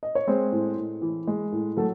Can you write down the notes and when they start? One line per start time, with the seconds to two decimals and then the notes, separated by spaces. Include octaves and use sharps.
0.03 D#5
0.15 C#5
0.27 G#3 C4 C5
0.52 A2
0.77 A2
1.02 E3
1.27 G#3
1.52 A2
1.77 F#3 A3 A4